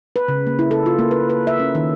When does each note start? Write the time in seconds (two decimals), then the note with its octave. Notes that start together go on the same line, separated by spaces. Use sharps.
0.16 B4
0.28 C#3
0.47 A#3
0.59 E4
0.71 A4
0.86 F4
0.99 A#3
1.11 B4
1.30 B4
1.47 E5
1.60 C#4
1.75 D#3